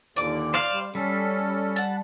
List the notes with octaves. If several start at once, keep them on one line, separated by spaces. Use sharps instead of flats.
D#2 A#2 D3 D5 D6
C5 D5 F5 C6
G3
G3 C#4 A4
F#5 A5